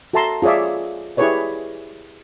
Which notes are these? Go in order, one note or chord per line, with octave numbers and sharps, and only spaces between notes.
F#4 A4 E5 A5 A#5 C6
F4 G#4 C#5 D5 E5
E4 G4 G#4 B4 C#5 D5